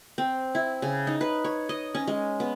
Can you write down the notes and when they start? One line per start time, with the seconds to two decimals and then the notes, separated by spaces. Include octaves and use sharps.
0.18 C4
0.55 E4
0.82 C#3
1.07 D#4
1.21 B4
1.44 C#5
1.69 D#5
1.95 C#4
2.07 G#3
2.40 B3